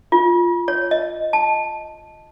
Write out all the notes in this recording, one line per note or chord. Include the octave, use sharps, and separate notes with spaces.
F4
C#5
D#5
A5